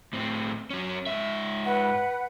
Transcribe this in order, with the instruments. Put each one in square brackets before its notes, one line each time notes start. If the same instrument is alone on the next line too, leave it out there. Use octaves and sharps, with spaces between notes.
[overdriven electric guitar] A2 C4
F#3 C#4
G#2 E5
[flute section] B4 F#5